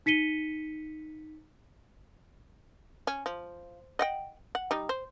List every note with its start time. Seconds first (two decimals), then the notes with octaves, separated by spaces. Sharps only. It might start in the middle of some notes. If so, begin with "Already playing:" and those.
0.06 D#4 B6 C#7 D#7 G7
3.07 C#4
3.26 F3
3.99 D#5 F#5 G5
4.55 F#5
4.71 G3 D#4
4.89 C5